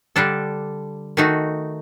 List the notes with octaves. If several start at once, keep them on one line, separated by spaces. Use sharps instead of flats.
D3 G3 D4 A4
D#3 A3 D#4 F#4